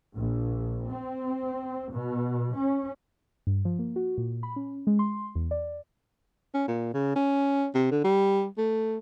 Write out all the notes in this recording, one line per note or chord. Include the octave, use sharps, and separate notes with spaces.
A#1
C4
B2
C#4
G2
F3
A#3
F#4
A#2
B5
C#4
G#3
C6
E2
D5
C#4
A#2
C#3
C#4
C3
D3
G3
A3